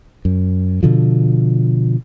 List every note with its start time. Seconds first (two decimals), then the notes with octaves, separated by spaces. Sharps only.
0.25 F#2
0.83 B2 D3 F3